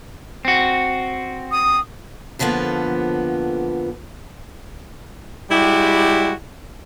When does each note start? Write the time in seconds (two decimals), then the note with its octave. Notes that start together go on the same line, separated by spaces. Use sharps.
0.45 C4 F#4
1.52 D#6
2.39 F2 D3 F3 A#3 B3
5.51 G3 G#3 E4 F#4 G4